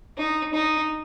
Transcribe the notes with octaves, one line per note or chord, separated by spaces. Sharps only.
D#4
D#4